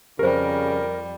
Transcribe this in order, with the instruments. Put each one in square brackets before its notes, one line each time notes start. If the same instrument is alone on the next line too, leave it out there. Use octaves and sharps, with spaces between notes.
[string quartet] F2 G3 [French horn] C#3 [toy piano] G4 C5 [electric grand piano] A#4